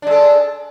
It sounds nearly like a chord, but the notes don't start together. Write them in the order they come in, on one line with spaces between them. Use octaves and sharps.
D4 G#3 A4